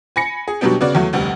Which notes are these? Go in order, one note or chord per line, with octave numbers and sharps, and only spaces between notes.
G#5 B5 A#6 C#7
G#4
B2 F#3 G3 B3 D4 G4
C#3 B3 F#4 D5
E2 F#3 A3
F1 D2 G3